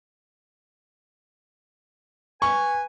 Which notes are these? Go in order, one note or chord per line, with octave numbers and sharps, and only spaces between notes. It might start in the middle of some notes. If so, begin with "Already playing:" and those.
B4 G#5 C#6